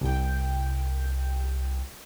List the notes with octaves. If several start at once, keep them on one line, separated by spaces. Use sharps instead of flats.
C2 G5